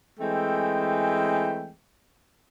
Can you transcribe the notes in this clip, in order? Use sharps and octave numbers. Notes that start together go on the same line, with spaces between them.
E3 G#3 A3 C4 G5